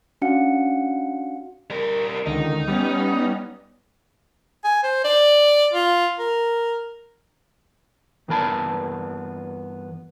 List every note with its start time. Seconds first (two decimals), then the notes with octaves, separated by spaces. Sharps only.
0.22 C#4 D4 F#4 F5 F#5 C#7
1.70 G3 A#4
2.26 C#2 D3 D#3 D#4
2.68 G3 B3 C#4
4.64 G#5
4.83 C5
5.04 D5
5.74 F4
6.19 A#4
8.28 G2 E3 B3 A#4 A5 B5